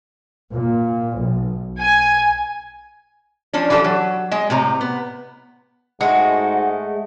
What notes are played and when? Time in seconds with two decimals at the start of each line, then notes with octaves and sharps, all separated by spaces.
0.54 A#2
1.20 B1
1.80 G#5
3.53 F3 C#4 D4
3.70 E3 F3 G4 A4
3.84 F#3
4.31 G#3 D#5
4.50 A2 C3 A#5
4.81 B3
6.01 G#2 G#3 A3 F#4